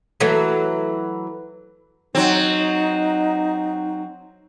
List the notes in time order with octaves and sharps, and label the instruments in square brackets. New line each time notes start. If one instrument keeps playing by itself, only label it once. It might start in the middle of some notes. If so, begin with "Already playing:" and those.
[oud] E3 F#3 A3
[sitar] F#3 C4 [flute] D#4